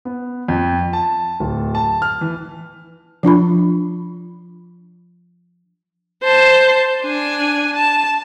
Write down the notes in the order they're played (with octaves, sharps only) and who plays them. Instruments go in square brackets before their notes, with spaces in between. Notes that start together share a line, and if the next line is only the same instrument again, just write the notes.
[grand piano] B3
F2
A5
D1
A5
F6
E3
[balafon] F3 D4 F4 B5
[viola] C5 A5
D4 G#5
A5